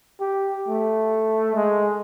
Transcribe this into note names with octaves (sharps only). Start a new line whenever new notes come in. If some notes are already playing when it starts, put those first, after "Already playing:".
G4
A3
G#3